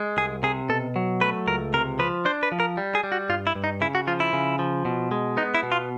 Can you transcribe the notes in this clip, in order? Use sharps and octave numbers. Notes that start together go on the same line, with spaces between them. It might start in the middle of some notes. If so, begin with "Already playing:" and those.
Already playing: G#3
C2 G#4
C3 G#4
B2 A4
F#3
A3 B4
C#2 A#4
C3 A#4
F3 B4
D4 C5
B4
F3
A#4
G3
G#4
G3
F#4
G2 F4
E4
G2
D#4
C#3 E4
F#4
F3 F4
E4
C#3
F3
B2
G#3
B3 D#4
E4
B2
F4